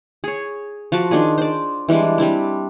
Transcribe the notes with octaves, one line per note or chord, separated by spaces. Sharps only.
G#4 C#5
F3 F#4 A5 D6
D#3 D4 F4 G#4
C5 D5
E3 G3 G#3 D4
G3 C4 D4 E4